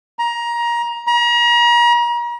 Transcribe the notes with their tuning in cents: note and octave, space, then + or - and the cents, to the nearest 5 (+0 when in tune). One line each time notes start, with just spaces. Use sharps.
A#5 +20
A#5 +40